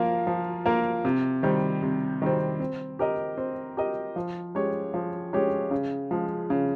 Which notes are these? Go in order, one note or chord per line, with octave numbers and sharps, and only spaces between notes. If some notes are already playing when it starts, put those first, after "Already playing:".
Already playing: F3 A#3 F4 A#4
F3
A#3 F4 A#4
C3
D#3 G3 C4
C3
D#3 G3 C4
C4
G4 A#4 D#5
C4
G4 A#4 D#5
F3
G#3 C#4 G4 C#5
F3
G#3 C#4 G4 C#5
C#3
F3 G#3
C#3